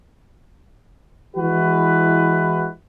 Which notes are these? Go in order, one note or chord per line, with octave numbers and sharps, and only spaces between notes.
E3 G#3 E4 F#4 B4